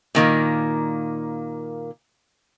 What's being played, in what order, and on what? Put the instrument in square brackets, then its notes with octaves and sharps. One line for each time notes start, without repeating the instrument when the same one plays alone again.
[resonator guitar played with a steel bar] A#2 D#3 A#3